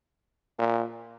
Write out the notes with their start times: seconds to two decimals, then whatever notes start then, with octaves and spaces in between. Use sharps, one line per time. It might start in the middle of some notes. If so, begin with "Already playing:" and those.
0.59 A#2